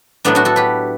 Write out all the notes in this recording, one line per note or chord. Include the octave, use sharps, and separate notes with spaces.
A2 F#3 B3 D4
D4 F#4
F#4 A4
G4 B4